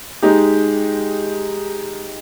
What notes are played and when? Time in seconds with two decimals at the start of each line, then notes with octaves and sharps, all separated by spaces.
0.22 G#3 D#4 G4